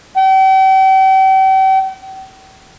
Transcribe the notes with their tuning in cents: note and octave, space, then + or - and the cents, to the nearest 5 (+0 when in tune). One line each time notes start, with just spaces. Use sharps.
G5 -40